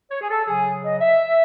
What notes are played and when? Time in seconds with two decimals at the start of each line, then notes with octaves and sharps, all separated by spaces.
0.11 C#5
0.21 G#4
0.29 A4
0.47 C#3 F#3 G#4
0.83 D#5
1.01 E5